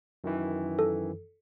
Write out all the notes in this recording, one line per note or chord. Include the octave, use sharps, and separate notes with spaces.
F#2 D#3 E3
A4